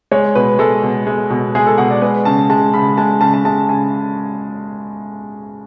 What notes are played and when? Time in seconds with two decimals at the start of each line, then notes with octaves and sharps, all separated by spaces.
0.11 G#3 C#5
0.35 B2 B4
0.59 G#3 A4
0.83 B2
1.07 G#3
1.30 B2
1.55 G#3 G#4
1.67 A4
1.78 B2 F#5
1.91 D5
2.02 G#3 B4
2.25 C#3 A5
2.50 G#3 A5
2.74 C#3 B5
2.97 G#3 A5
3.21 C#3 A5
3.34 A5
3.45 G#3 A5
3.69 C#3 G#5